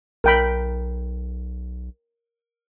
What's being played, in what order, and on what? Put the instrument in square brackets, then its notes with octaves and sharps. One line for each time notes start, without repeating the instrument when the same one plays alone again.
[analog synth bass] B1 [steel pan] A#4 G5 B5